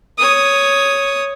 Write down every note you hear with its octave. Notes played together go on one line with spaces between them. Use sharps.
C#5 D#6